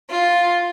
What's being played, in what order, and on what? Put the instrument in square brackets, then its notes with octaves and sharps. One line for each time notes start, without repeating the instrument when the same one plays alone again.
[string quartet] F4